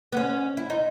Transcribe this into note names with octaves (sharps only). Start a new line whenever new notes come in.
B3
C#4
E4
D#4